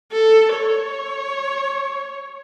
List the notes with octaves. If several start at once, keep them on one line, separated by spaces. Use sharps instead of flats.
A4
C#5